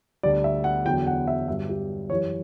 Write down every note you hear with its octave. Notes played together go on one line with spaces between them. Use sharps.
D2 D3 G3 D5
E5
F#5
E2 D3 F#3 G5
F#5
E5
G2 D3 F#3 E5
G4
F#2 E3 G3 C#5